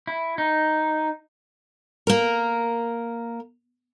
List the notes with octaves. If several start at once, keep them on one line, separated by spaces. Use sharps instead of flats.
E4
D#4
A#3 A#4